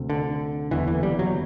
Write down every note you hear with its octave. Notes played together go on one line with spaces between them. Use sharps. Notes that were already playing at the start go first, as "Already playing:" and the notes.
Already playing: D2 C3
D3
F#1 E2 D3 E3
E3
G3
F#3